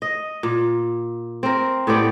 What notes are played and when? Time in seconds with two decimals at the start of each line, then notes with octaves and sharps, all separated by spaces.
0.02 D#5
0.43 A#2
1.43 C4 A#4
1.87 A2 B3 G4 D5